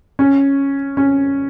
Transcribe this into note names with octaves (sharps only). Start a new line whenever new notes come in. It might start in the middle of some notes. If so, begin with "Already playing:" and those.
C#4
C#4